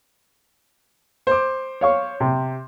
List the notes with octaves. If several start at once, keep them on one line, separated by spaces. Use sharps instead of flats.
C5 D6
C#5 F5 C#6
C3